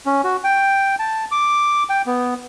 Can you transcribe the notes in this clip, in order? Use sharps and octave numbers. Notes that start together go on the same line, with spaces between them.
C#4
F#4
G5
A5
D6
G5
B3